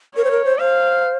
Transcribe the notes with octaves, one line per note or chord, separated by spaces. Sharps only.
A#4 C#5
C5
A#4
C5
C5 F5